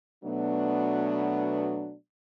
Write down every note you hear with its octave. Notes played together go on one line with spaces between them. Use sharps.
B2 F#3 A3 B3 D4